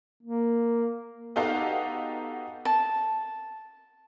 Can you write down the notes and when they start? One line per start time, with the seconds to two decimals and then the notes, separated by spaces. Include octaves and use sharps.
0.23 A#3
1.36 B3 D#4 F#4 G4 A4 F5
2.65 A5